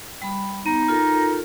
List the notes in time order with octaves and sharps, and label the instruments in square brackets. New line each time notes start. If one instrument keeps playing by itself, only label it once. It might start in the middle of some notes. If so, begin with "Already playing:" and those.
[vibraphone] G3 B5
[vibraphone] B3 [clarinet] D#4
[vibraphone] F4 A4 A#4